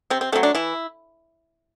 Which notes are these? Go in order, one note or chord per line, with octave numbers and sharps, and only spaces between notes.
C3 C4
C4
F#3 A3 C4
D4
E3 E4